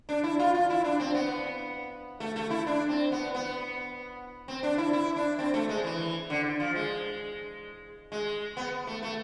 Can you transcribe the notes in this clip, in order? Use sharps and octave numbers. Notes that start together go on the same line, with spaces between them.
D4
E4
F4
F4
E4
D4
C4
B3
A3
A3
E4
D4
C4
B3
B3
C4
D4
E4
E4
D4
C4
A3
G#3
E3
D3
F3
G#3
G#3
B3
A3
A3